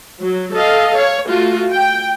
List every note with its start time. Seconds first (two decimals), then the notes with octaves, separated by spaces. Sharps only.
0.21 F#3
0.54 A4 D#5 F5
0.98 C#5
1.29 A3 F4 F#4
1.72 G5